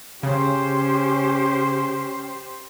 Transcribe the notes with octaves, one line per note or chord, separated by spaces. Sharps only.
C#3 C#4 G4 C5